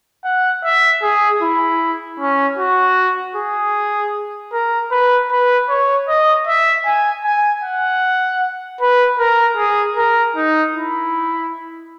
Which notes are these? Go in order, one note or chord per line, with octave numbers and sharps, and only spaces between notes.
F#5
E5
G#4
E4
C#4
F#4
G#4
A#4
B4
B4
C#5
D#5
E5
G#5
G#5
F#5
B4
A#4
G#4
A#4
D#4
E4